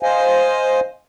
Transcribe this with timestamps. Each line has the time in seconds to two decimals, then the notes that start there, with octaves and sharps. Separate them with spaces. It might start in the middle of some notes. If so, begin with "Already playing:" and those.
0.03 C5 D#5 F5 G#5